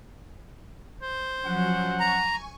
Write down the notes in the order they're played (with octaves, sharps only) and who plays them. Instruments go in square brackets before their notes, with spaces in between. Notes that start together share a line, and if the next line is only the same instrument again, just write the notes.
[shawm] C5
[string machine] F3 F#3 [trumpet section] C#4 F#5
[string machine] G#5 C#6 [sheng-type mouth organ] A#5